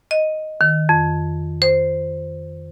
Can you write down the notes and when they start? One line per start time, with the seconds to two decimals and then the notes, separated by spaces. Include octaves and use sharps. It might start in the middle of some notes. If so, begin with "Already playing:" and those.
0.11 D#5
0.61 D#3
0.89 F2
1.62 C5